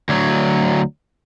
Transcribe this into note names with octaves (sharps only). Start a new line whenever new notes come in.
D2 F#3